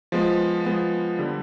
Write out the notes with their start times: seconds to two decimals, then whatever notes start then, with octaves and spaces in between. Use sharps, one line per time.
0.12 F3 G#3 B3
0.65 F3 G#3 B3
1.19 D3 G3